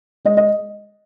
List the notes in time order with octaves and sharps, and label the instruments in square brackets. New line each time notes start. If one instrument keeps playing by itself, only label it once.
[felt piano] G#3 D#5
D#5